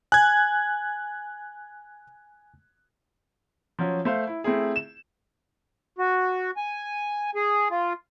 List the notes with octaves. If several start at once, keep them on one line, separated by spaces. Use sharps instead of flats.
G#5 F#6 G#6
F3 F#3 C#4
A3 C5 F5
E4
A3 C4 E4 G#4
E7
F#4
G#5
G#4
F4